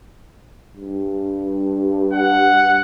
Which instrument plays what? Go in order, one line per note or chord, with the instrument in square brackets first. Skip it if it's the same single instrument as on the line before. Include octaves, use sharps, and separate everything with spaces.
[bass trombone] G2
[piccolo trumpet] F#5